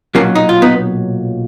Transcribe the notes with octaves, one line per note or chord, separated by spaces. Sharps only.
B1 A#2 F#3 A#3 C#4
D#4
F4
B3 D#4